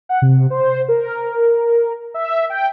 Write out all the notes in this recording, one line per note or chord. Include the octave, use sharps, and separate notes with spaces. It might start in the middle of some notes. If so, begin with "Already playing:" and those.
F#5
C3
C5
A#4
E5
G5